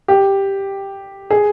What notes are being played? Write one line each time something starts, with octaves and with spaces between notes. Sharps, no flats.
G4
G#4